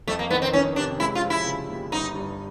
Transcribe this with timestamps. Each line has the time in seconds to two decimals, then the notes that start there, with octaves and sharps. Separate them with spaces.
0.08 F2 A3
0.19 A#3
0.30 D#3 B3
0.42 C4
0.53 D#3 C#4
0.76 C3 D4
1.00 G#3 E4
1.15 F4
1.22 F3
1.30 E4
1.46 C#3
1.69 D#2
1.92 G1 D#4
2.15 G2